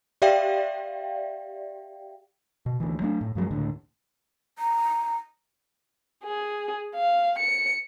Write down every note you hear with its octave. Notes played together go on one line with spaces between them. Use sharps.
G4 D5 E5 F5 G5
B2
D2 E3
F#3 A3 D4
A2
G2 F3 F#3 G#3
C#2 A2 D3
A#5
G#4
F5
C#7